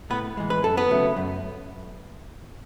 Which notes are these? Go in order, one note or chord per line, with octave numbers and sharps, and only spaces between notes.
A2 B3 B4
E3 G#3
B4
F#2 A4
B3 B4
C#3 F#3 A3
F#2